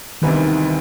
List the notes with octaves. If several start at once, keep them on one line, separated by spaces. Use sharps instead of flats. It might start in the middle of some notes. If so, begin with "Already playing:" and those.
D2 C3 D#3 E3 G3 B3